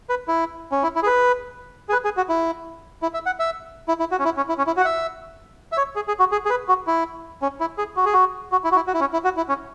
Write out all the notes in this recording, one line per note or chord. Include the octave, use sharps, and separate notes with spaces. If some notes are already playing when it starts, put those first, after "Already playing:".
B4
E4
C#4
E4
E4
G#4
B4
G#4
B4
G#4
F#4
E4
E4
E5
F#5
E5
E4
E4
F#4
C#4
E4
C#4
E4
C#4
E4
F#4
F#5
E5
E5
C#5
G#4
G#4
F#4
G#4
G#4
B4
F#4
E4
C#4
E4
G#4
F#4
G#4
F#4
F#4
E4
F#4
E4
F#4
E4
C#4
E4
F#4
E4
C#4